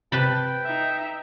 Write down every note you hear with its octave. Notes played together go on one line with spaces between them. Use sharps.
C3 B4 G5 A5 B5
D#4 E5